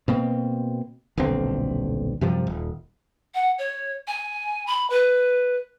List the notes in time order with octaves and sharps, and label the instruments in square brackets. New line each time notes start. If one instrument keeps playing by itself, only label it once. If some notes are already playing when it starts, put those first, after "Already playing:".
[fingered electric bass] B2 A#3 C4
D#1 B1 D3 C4
F#2 C3 F3 G3
D#1
[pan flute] F#5
C#5
G#5
B5
B4